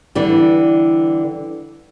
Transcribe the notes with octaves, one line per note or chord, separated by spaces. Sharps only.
D3 E3 G3